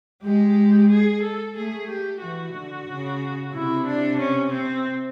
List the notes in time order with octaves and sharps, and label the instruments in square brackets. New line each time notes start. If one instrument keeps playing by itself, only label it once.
[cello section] G#3 [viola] G4
[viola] G#4
A4
[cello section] A3 [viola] G#4
[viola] G4
[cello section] E3 [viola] F#4
[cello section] D3
C#3
[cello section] C3 [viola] E4
[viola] D4
C#4
C4